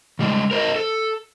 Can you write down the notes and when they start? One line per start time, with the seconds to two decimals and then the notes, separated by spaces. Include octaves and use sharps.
0.19 C#3 G3 G#3
0.51 A#4 C5 D#5
0.76 A4